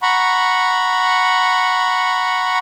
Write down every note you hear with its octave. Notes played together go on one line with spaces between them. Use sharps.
F#5 A#5 B5 C#6